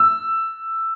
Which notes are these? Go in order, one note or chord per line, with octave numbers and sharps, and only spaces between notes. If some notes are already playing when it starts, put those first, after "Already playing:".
Already playing: E6